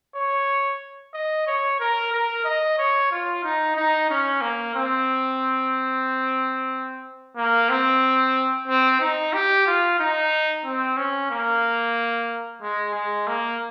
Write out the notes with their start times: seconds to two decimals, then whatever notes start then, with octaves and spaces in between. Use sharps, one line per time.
0.15 C#5
1.14 D#5
1.47 C#5
1.80 A#4
2.13 A#4
2.44 D#5
2.78 C#5
3.11 F4
3.43 D#4
3.76 D#4
4.10 C#4
4.41 A#3
4.75 C4
7.37 A#3
7.70 C4
8.68 C4
9.01 D#4
9.34 G4
9.67 F4
10.00 D#4
10.65 C4
10.97 C#4
11.31 A#3
12.62 G#3
12.94 G#3
13.27 A#3